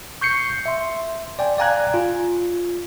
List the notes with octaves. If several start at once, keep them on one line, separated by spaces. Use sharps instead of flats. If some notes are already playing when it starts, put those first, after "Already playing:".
C#6 G6 C7 C#7
E5 C6
D5 G5 G#5
D5 F5 G#5 A#5 F#6 G#6
F4